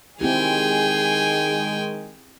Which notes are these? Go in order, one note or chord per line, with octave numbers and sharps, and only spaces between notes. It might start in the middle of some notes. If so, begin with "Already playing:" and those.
D#3 G#3 C4 E4 G4 G#4 G5 G#5